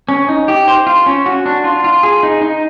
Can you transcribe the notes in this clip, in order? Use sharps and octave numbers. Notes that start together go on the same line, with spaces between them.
C#4
D#4
G4
C5
F4
C#4
F#4
D4
F4
F4
G#4
D#4
D#4